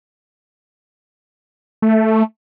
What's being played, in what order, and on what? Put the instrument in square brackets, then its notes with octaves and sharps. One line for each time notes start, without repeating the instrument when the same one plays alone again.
[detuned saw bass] A3